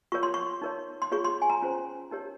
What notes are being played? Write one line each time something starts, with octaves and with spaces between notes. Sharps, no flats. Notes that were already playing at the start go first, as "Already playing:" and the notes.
F4 A#4 C#5 C#6
C6
C#6
D#4 A#4 C#5
C6
F4 G#4 C#5 C#6
C6
G#5
A#5
C#4 F4 C5 A#5
D#4 G4 A#4 C#5